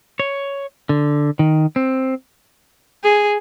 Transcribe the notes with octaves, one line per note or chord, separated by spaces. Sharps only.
C#5
D3
D#3
C4
G#4